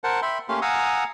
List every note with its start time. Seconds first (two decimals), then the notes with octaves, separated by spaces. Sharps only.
0.04 A#4 C5 F#5 A5
0.22 E5 G5 B5 C6
0.49 A3 A#3 C#4 G4 F5 C6
0.62 F5 F#5 G#5 A#5 D#6 E6